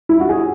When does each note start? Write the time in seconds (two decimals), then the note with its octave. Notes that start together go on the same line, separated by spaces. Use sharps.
0.09 E4
0.20 F#4
0.29 G#4